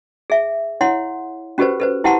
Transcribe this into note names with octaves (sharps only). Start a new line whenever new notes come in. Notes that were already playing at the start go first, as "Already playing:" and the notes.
G#4 E5
E4 C#5 F#5 C6
C#4 F#4 G4 A4 B4 C5
A4 B4 C5
E4 G4 F#5 A5 C6